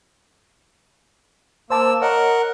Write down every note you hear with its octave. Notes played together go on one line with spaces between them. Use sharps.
A#3 C5 A5 D6 E6
A#4 C#5 D#5 F#5 A#5